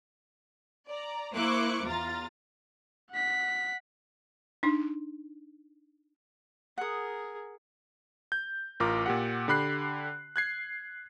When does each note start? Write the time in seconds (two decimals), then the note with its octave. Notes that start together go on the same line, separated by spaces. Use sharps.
0.88 D5 A#5
1.35 A#3 E4 C5 C#6 D6 F#6
1.86 E2 F4 A#5 A6
3.11 F#5 B6
4.63 D4 D#4
6.78 G#4 A#4 F#5 D#6
8.32 G6
8.80 A1 F4 A#4 D6
9.06 A#2 G4 F#5
9.48 D3 G4 B5 F#6 C7
10.36 F#6 G#6 C7